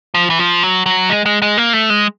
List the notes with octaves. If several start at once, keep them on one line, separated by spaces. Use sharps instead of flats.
F3
E3
F3
F#3
F#3
G#3
G#3
G#3
A#3
A3
G#3